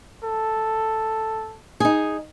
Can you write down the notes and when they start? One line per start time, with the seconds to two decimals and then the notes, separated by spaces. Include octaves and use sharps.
0.23 A4
1.80 D#4 G#4